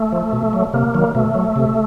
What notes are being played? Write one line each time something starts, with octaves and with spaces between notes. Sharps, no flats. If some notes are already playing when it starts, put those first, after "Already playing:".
Already playing: A3
F3
B2
F#3
C3 A#3
D#3 F#3
B2 A3
F#3
C3